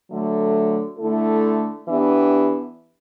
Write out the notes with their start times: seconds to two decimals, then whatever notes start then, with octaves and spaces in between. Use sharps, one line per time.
0.11 D3 F#3 A3
0.99 D3 A3 E4 A4
1.87 E3 B3 D4 G4